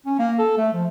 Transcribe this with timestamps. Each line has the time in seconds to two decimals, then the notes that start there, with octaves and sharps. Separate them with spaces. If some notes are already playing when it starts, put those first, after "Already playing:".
0.06 C#4
0.19 A#3
0.38 A4
0.57 A3
0.73 F3